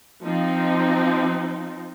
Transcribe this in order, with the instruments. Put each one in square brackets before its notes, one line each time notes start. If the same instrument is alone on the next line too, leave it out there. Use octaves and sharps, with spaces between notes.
[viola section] F3 C4 D#4